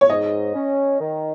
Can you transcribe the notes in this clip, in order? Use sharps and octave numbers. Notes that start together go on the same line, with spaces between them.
C#5
G#2 D#5
C#4
D#3